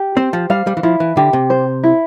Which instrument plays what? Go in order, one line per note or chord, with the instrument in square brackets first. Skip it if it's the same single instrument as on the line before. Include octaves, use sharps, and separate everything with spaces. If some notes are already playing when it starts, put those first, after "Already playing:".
Already playing: [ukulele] G4
[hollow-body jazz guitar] C4 [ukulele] C5
[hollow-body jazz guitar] F3
[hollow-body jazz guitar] G3 [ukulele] F5
[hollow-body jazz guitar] G3
E3
[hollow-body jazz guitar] F3 [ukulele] E4
[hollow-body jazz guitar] E3
[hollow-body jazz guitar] D3 [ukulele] G4
[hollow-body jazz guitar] C3
[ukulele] C5
E4